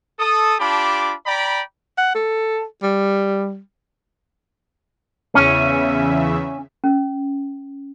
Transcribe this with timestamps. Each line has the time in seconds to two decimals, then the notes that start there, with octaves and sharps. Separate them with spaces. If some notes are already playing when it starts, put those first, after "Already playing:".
0.20 A4 D#6
0.59 D4 F4 G4 A5 B5 D6
1.26 D5 G5 A#5 B5
1.98 F#5
2.15 A4
2.83 G3
5.35 E2 C#3 C#4 E5
6.84 C#4